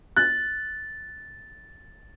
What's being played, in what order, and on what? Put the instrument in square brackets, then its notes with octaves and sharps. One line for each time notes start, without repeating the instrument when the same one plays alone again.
[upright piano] F#6 [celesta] A6